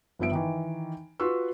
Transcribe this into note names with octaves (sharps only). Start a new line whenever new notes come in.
G1 F3 B3 E5 D7
D#3 E3
F4 F#4 B4 C6 C#6 E6